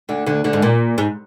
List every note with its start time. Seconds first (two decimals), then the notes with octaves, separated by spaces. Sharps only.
0.09 D2 D3
0.26 D2 D3
0.44 D2 D3
0.53 G#2
0.62 A#2
0.98 G#2